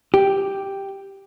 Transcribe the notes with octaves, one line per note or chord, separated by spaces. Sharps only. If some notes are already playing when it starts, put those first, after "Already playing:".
G4